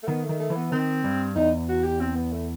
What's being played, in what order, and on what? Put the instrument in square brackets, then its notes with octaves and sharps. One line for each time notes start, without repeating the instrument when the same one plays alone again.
[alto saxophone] A3
[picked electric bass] D#3 [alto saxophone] B3
[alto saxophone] A3
[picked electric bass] D#3
[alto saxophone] A3
[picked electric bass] E3
[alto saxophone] B3
[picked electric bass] D#3 [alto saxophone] C4
[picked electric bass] G2
[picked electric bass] E2 [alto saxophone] D#4
[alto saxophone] F#4
G4
C4
B3
A3